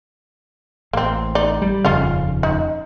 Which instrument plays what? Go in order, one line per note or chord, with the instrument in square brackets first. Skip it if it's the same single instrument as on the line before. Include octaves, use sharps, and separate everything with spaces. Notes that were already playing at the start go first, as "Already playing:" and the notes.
[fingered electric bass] A1 [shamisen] A#3 C4
[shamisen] D#4 D5
[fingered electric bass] G3
[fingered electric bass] D#1 F2 C#3 [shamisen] C#4 F4 F5
[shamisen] D#4